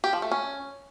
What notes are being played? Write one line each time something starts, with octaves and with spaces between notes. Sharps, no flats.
G4
F3
A3
C#4